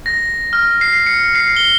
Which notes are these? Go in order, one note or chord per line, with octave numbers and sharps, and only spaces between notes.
A#6
F6
C7
C#7
C7
G7